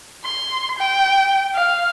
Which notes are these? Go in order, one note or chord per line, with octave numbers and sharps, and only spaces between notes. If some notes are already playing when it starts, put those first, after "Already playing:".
C6
G5
F5